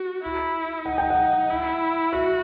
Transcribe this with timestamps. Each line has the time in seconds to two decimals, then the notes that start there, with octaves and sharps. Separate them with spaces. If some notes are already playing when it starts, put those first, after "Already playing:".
Already playing: F#4
0.23 E4
0.86 D#4 F#5
0.98 G5
1.10 F#5
1.49 E4
2.12 F#4 E5